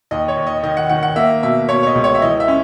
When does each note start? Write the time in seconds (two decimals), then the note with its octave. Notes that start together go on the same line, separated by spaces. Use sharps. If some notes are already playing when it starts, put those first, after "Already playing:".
0.11 D#2 D#5
0.28 C#5
0.37 D#2
0.47 D#5
0.63 D#3 D#5
0.77 F#5
0.89 D#3 F#5
1.03 F#5
1.16 A#3 E5
1.42 B2 E5
1.69 B2 C#5
1.83 C#5
1.87 D#5
1.95 C#2
2.04 C#5
2.15 E5
2.22 E3 D#5
2.40 E5
2.48 C#4